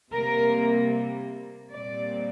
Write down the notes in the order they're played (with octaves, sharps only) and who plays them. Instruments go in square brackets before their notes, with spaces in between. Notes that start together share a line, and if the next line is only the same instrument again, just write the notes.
[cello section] C3 G3 A#3 A#4
A#2 G3 C4 D5